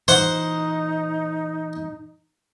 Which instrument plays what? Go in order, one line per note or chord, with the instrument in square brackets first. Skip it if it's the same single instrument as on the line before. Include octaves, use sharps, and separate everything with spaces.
[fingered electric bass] A#2 E3 [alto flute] D#4 [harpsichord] C5 F#5